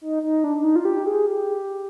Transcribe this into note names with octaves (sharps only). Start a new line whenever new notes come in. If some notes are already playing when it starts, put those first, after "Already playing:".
D#4
D#4
D4
D4
D#4
F4
G4
G#4
G4